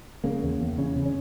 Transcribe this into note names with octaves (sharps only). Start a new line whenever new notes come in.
C#3 A#3
E2
E2
C#3 C#4
C#3
C#4